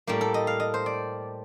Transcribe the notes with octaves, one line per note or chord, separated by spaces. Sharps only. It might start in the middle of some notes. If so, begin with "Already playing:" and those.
A2 G3 A#3 G4
A4
D#5
F5
D#5
C5
D5